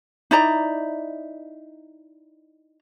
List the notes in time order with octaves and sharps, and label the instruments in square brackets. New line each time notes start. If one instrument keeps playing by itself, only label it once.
[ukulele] D#4 E4 D5 A#5